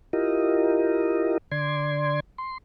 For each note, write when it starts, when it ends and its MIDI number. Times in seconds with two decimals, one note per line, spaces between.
0.13 1.38 64
0.13 1.38 65
0.13 1.38 67
0.13 1.38 70
0.13 1.38 75
1.51 2.20 50
1.51 2.20 74
1.51 2.20 84
1.51 2.20 92
2.38 2.58 84